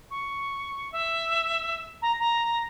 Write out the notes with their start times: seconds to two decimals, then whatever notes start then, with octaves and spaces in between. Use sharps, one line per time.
0.10 C#6
0.92 E5
2.02 A#5
2.19 A#5